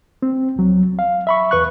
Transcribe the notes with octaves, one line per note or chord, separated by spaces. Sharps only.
C4
C2 F#3
F5
E5 B5 C#6
E2 B4 C#6 F#6